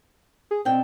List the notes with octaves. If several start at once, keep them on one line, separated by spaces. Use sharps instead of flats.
G#4
B2 C4 D4 G5